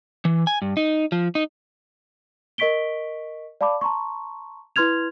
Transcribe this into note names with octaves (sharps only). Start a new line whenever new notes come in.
E3
G#5
G2
D#4
F3
D#4
A#4 D#5 C#6 B6 D7 G7
D5 F5 A5 B5 D6
A5 A#5 C6 C#6
E4 B4 C6 F6 G#6 F7